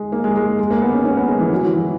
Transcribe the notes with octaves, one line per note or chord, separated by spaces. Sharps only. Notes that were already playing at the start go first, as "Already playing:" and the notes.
Already playing: G#3
A#3
G#3
G#3
G#3
A#3
B3
C#4
C#4
B3
G#3
E3
F#3
F#3
E3